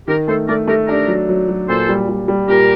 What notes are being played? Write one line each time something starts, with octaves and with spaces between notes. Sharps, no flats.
D#3 G4 A#4
A3 A4 C5
A3 A#4 D5
A3 G4 A#4
D4 G4 A#4
F#3
F#3
F#3
A#2 A4 C5
G3
G3
G3
A#2 G4 A#4